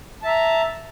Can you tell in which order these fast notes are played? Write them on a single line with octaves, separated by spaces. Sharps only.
A5 E5 A#5